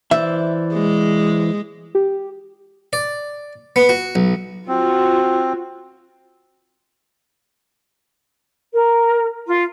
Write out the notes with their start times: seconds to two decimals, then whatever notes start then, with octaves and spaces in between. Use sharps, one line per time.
0.11 E3 C5 D5 E5
0.74 G#3
1.95 G4
2.93 D5
3.76 B3
3.89 F#4
4.15 B1
4.68 C4 F4 F#4
8.74 A#4
9.47 F4